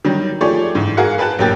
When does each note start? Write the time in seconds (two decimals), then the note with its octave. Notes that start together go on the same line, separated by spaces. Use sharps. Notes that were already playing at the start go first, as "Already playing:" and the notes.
0.05 D#3 F#3 G3
0.41 F3 A3 G4 G#4 C#5 D5
0.75 G#2 E3
0.97 F#4 G#4 A#4 F5 F#5
1.18 G#4 B4 G5 A5 F#6
1.39 A1 F#3 A#3 G4 G5 A6